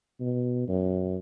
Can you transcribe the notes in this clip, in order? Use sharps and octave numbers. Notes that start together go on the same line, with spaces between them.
B2
F#2